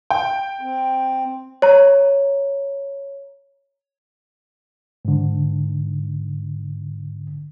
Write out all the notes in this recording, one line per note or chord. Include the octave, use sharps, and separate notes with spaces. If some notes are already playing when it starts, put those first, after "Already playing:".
G5
C4
C#5 A#5
G#2 D3